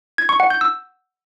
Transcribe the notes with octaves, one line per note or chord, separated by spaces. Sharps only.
G#6
C#6
F#5
G6
E6